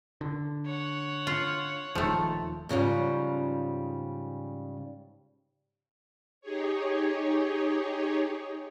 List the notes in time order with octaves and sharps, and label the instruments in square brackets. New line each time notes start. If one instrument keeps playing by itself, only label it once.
[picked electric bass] D3
[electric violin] C#5 F#5
[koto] F4
[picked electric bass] D#1 D#3 [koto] F3 A3
[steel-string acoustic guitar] G#2 C#3 F3 G3
[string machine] D#4 G4 G#4 C#5